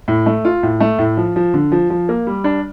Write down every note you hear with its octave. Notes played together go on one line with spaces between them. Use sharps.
A2
A3
F4
A2
A3
A2
F3
F3
D3
F3
F3
A#3
G3
D4